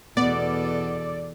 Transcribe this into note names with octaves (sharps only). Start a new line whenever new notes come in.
E2 B2 B3 A4 D5